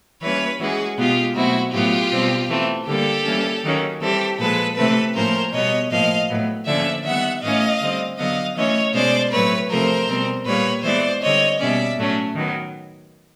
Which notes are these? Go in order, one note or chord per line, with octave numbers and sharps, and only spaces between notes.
E3 G3 A#3 C#4 B4 C#5
E3 G#3 C#4 F#4 G#4
B2 G#3 B3 F4 G4
B2 F#3 A3 C4 E4 F#4
A2 F#3 B3 F4 G4
B2 G3 C4
E3 A3 C4
D3 G3 A#3 G4 A4
E3 G3 A#3 C#4
D#3 F#3 A#3 C#4
E3 G3 C4 G4 A4
A#2 F3 G#3 A4 B4
C3 E3 A3 C4 A4 B4
A2 F3 A#3 C#4 A#4 C5
B2 G3 B3 C#5 D#5
A2 F3 A#3 D#5 F5
A2 F#3 B3
D3 F3 A#3 C#4 D5 E5
D#3 G3 B3 E5 F#5
A2 E3 A3 C#4 D#5 F5
D3 G3 C4
D3 F#3 B3 D#5 F5
E3 A3 C#4 C#5 D#5
B2 G#3 C#4 C5 D5
A2 F#3 A3 C4 B4 C#5
C3 F3 A3 A#4 C5
B2 G3 C4
A#2 G3 A#3 B4 C#5
E3 G#3 B3 C5 D5
D3 G3 C4 C#5 D#5
B2 G3 A#3 C#4 D5 E5
A2 F#3 A3 C#4
D#3 F#3 B3